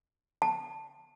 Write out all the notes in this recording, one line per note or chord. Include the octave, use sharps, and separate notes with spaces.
A5